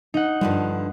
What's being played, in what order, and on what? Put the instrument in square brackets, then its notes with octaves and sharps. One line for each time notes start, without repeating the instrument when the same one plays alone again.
[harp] D#4 F#5
[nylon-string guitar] G2 D3 F3 [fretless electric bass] G3